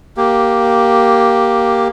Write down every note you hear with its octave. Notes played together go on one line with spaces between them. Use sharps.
A#3 G4